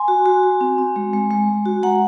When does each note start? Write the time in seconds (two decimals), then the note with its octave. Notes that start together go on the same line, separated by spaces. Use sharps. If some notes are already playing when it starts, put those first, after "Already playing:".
Already playing: G#5 C6
0.08 F#4
0.26 F#4
0.43 F#4
0.61 C4
0.78 C4
0.96 G#3
1.13 G#3
1.31 G#3
1.49 G#3
1.66 F#4
1.83 G#3 F#5 A#5